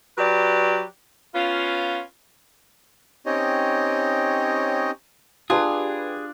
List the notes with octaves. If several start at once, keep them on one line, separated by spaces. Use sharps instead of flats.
F#3 G4 B4 D5
B3 C#4 F4
C4 C#4 D#4 G4 C#5 D#5
D4 F4 G4 G#4 B4